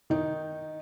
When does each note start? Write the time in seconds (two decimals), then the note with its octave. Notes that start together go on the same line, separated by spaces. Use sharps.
0.10 D#3 D#4